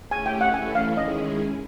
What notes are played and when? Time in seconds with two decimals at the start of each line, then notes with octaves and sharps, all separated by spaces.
0.11 A3 C#4 E4 G4 G#5
0.26 G5
0.41 F#5
0.54 E3 A3 C#4 E4 A4 G#5
0.75 F5
0.97 D#3 G#3 C#4 E4 G#4 D#5